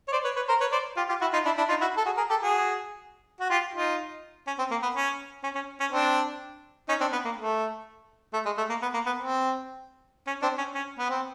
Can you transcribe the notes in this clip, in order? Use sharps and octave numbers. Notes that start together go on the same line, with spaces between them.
C#5
C5 D5
B4 C#5
B4 C#5
A#4 C5
B4 C#5
C5 D5
F4 G4
F4 G4
E4 F#4
D#4 F4
D4 E4
D4 E4
D#4 F4
E4 F#4
A4
F#4 G#4
G#4 A#4
G4 A4
F#4 G#4
F#4
F4 G4
D#4 F4
C#4
C4
A#3
B3
C#4
C#4
C#4
C#4
C4 D4
C#4 D#4
C4 D4
B3
A#3
A3
A3
G#3
A3
A#3
B3
A#3
B3
C4
C#4
C4 D4
C#4
C#4
B3
C4